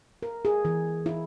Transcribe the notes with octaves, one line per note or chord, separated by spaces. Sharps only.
A#4
G#4
E3
E4